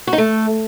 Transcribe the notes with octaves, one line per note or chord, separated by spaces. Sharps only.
F#4
D#4
A3